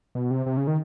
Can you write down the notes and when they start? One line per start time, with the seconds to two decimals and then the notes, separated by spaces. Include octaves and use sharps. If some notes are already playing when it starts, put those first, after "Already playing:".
0.15 B2
0.31 C3
0.46 C3
0.57 C#3
0.67 D#3